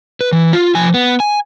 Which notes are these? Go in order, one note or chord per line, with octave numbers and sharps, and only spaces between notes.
B4
E3
F4
F3 G#5
B3
G#5